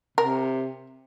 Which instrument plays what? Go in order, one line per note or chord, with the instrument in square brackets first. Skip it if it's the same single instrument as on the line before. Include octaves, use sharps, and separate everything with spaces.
[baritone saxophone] C3 [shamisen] A#4